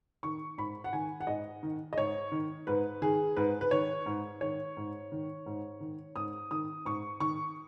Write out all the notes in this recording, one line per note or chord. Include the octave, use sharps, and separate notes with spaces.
D#3 C#6
G#2 B5
F#5
D#3 G#5
F#5
G#2 D#5
D#3
D#5
G#2 C#5
D#3
G#2 B4
D#3 G#4
G#2 B4
B4
D#3 C#5
G#2
D#3 C#5
G#2
D#3
G#2
D#3
G#2 D#6
D#3 D#6
G#2 C#6
D#3 C#6